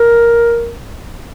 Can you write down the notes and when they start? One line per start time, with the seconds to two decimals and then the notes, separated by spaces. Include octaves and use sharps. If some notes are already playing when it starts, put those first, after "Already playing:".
Already playing: A#4